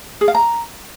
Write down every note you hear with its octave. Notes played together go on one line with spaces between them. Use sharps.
G#4
F5
A#5